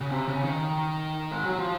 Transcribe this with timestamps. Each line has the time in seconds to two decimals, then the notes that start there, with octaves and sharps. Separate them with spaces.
0.01 C#3
0.11 C3
0.28 C#3
0.43 D#3
1.32 G#3
1.44 F#3
1.58 F3